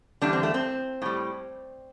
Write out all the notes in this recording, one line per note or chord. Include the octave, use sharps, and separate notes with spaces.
E2 D3 G3 D4
C4
A3
C4
A2 G3